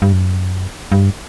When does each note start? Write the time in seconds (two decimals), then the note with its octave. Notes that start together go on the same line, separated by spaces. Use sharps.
0.02 G2
0.12 F#2
0.92 G2